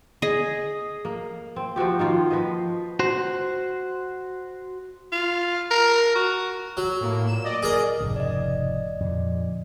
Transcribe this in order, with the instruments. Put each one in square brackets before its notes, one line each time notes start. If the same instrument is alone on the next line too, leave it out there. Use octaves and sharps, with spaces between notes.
[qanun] G#4 D#5
[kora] A#3
C4
F3 C4 F#4 G4
D#3 A#3 F4 F#4
F3 B4 C5 D#5
[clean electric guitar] F#4 C5
[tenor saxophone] F4
A#4
F#4
[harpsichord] F#3
[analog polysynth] A2 A#3
A#2 E7
D5 D#5
[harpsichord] G#4 A#4
[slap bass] F1 G#2 C#3
[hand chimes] D5 D#5
[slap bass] F2 A#2 D3